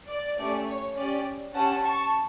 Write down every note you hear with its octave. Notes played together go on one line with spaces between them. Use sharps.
D5
A3 C#4 G4 D5
C#5
C#4 G4 D5
C#4 G4 F#5 A5
A5 C#6